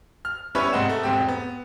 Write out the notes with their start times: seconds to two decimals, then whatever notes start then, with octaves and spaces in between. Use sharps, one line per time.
0.25 F6
0.55 G3 B3 C#4 E4 B4 C#5
0.73 G#2 C3 D#5 F#5 E7
0.89 A3
1.03 E1 G#2 C4 G4
1.28 B3